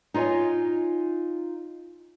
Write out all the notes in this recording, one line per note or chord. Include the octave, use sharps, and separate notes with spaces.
D#4 F4 C#5 D#5 G#5